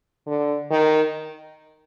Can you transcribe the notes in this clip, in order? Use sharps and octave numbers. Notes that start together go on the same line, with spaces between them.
D3
D#3